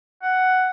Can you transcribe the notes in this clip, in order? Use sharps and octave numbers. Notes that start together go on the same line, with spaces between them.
F#5